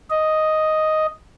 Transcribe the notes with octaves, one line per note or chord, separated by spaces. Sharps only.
D#5